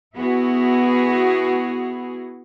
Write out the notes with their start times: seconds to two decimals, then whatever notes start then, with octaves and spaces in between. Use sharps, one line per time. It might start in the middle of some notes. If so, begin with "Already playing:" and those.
0.15 B3 E4 F#4 G#4